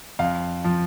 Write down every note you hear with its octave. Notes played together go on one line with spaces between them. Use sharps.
F2 F5
F3